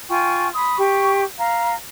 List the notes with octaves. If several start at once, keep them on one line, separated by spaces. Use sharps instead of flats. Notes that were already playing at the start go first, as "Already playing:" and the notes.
F4 G5 G#5 C#6
B5 C6 D#6
G4 C#6
F5 A#5